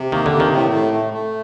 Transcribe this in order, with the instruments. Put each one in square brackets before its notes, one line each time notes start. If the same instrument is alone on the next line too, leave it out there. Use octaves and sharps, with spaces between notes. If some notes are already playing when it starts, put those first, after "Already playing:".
Already playing: [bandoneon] C3
[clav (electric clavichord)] D#3 [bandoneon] A#3
[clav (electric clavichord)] D3
[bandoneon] C3
[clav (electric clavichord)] D#3
[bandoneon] A2
A3
A3
A3